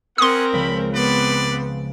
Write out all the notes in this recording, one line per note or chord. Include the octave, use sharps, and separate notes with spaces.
C4 C#4 G#4 A#4 F#5 C6 D#6
C#2 C#3 F3 B5
F3 B3 C4 D4 B4 D5